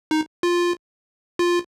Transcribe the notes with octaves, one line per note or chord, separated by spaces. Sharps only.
D#4
F4
F4